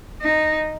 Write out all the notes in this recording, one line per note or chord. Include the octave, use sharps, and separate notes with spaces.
D#4